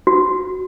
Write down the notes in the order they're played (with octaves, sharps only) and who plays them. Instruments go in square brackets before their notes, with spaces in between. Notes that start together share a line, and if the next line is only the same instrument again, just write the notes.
[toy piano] F#4